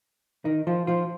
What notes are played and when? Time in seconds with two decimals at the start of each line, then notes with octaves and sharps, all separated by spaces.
0.45 D#3 D#4
0.67 F3 F4
0.87 F3 F4